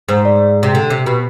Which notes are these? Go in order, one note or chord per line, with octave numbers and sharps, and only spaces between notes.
G#2 C5
D5
C3
D3
C3
B2